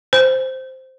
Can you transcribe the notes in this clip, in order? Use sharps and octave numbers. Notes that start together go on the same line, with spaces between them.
C5